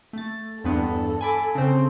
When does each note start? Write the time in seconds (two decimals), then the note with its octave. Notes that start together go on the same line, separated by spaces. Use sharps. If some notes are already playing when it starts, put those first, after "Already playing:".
0.13 A3 A6
0.64 E2 G2 B3 A4
1.21 G#5 B5 D6
1.55 C#3 C4